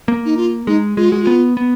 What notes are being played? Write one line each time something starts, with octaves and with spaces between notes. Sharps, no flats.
A#3
D#4
F4
G#3 D#4
G#3 F4
G#3 F#4
F4
B3
B3